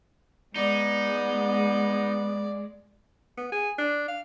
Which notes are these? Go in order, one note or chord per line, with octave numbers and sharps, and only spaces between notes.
G#3 B3 D#4 D5
B3
G#4
D4
F5